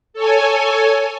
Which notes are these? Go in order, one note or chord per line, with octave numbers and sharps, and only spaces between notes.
A4 C#5 G#5